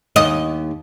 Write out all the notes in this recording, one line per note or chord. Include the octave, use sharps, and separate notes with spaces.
D#2 D#5